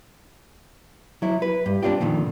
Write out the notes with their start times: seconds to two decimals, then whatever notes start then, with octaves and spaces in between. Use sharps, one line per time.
1.22 F#3 E4
1.42 B4
1.66 G2
1.83 C4 D4 D#4 F4 G4
2.00 F2 A#2 D3 D#3